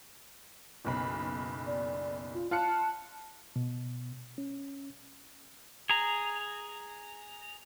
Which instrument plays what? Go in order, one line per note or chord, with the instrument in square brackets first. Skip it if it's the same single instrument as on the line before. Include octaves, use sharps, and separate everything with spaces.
[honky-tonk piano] F#1 B1 B5
[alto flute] D5
F4
[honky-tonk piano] F4 F#6 C#7 [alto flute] A5
[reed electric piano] B2
C#4
[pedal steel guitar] G#4 A#5